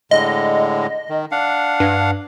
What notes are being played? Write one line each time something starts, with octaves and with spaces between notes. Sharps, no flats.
A2 D3 G#3 D#5
D#3
D4 F5 F#5
G2